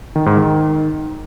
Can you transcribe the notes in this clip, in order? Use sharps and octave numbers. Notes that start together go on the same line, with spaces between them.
D#3
G#2
D#3